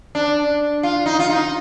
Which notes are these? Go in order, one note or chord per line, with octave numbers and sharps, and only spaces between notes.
D4
F4
D#4
F4
D#4